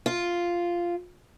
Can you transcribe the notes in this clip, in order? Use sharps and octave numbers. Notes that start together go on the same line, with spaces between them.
F4